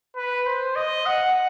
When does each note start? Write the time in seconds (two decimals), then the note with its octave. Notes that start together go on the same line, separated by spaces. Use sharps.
0.17 B4
0.46 C5
0.76 D#5
1.06 F#5